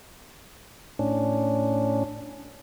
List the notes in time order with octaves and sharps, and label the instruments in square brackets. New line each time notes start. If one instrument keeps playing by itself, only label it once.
[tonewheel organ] A2 C#4 D4